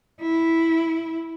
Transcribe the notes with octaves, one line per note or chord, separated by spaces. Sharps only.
E4